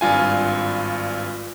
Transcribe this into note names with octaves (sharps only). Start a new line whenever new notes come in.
G#1 G2 F4 G#5